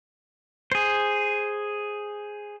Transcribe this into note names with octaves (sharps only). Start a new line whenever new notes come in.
G#4 C5